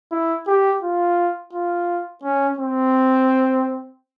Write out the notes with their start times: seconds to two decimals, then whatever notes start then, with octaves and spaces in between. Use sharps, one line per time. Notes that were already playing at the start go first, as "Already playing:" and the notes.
0.12 E4
0.47 G4
0.82 F4
1.53 F4
2.23 C#4
2.59 C4